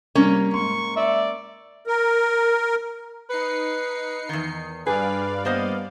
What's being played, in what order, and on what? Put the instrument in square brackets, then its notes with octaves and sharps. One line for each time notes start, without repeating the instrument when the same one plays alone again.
[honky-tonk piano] C3 G3 [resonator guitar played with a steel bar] A#3 C#4 A#4
[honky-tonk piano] G#2 C6 [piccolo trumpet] C#6
[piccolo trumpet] D5 [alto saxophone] E5
[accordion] A#4
[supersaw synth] D#4 C7 C#7 [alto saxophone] B4
[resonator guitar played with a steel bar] E2 D#3
[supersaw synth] G2 D5 F5 [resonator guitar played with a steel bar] G#4 [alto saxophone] B4
[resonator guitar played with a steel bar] A#3 C5 D#5 [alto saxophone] B3